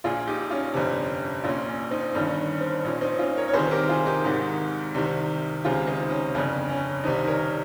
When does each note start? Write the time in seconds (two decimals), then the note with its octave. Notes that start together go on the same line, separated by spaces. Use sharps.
0.04 A#1 A#2 F4 G#4
0.27 D#4 G4
0.50 C#4 F4
0.74 G1 F2 C3
1.44 A#1 A#2 C#4 F4
1.68 C#4
1.90 C4 D#4
2.14 G1 G2 D#3 C#4
2.60 C4
2.84 A#1 A#2 C#4
3.01 C4 D#4
3.19 C#4 F4
3.37 A#4 C#5
3.48 C#5
3.53 C2 C3 D#3 G#4 C5
3.71 G4 A#4
3.89 F4 G#4
4.06 D#4 G4
4.24 G#1 G#2 D#3
4.94 C2 C3 D#3
5.64 C#2 C3 D#3 F4 G#4
5.87 C4 D#4
6.10 C#4
6.34 G1 F2 C#3 C#4
6.69 C#4
7.04 C2 C3 D#3 C4 D#4
7.27 A#4 C#5